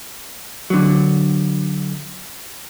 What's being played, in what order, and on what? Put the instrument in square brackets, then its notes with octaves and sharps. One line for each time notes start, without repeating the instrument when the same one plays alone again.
[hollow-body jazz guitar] D3 F#3